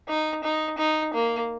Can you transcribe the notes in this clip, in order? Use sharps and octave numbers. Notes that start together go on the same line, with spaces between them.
D#4
D#4
D#4
A#3